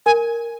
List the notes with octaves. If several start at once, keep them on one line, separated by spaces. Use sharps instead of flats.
A#4 G#5